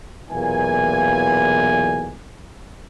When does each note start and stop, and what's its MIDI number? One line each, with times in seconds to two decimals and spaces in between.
0.31 2.14 35
0.31 2.14 40
0.31 2.14 46
0.31 2.14 52
0.31 2.14 58
0.31 2.14 80